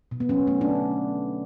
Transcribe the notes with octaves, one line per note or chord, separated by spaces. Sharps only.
B2
B3
F#3 C#4
A3 B3
D4